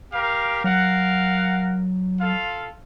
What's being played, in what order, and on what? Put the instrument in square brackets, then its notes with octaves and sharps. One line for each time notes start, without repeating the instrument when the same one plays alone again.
[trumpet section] G4 A#4 F5
[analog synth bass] F#3 [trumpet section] A#4 F5 F#5
[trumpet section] F4 A4 F5